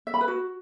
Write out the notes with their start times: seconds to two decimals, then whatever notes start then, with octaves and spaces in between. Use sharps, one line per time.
0.07 E5
0.14 B5
0.21 B4
0.28 F#4